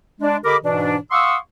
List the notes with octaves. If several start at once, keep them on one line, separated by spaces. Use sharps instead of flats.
G#3 D4
D3 G4 A#4 D#5 B5 D6
G#2 B2 E3 D4
F5 F#5 C6 C#6 D#6 E6